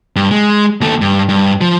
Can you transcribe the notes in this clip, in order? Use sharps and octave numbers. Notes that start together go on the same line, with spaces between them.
G2
G#3
D#2 A3
G2
G2
F3